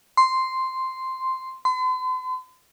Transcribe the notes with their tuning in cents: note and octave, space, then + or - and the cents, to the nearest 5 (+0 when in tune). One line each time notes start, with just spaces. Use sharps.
C6 -5
C6 -45